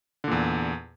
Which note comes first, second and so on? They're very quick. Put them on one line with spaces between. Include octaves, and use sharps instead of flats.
D3 A#2 E2